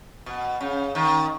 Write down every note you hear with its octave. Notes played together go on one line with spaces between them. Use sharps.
B2
C#3
D#3